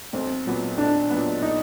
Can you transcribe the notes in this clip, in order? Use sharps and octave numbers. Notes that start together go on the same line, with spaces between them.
B1 C4
A#2 F#3 B3
B1 D4
A#2 F#3 B3
D#4